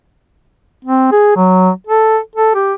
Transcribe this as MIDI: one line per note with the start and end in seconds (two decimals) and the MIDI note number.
0.85 1.10 60
1.12 1.34 68
1.37 1.70 54
1.87 2.19 69
2.35 2.52 69
2.55 2.74 67